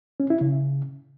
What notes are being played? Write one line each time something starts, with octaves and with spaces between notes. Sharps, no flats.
C#4
E4
C#3